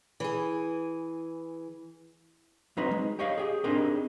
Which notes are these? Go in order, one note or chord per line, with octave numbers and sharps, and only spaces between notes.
E3 G#4
F#3 C4 D#4 B4 D#5
G#3
G4 C#5 D#5 F5
G4 G#4
C4 D4 D#4 G4 G#4 A#4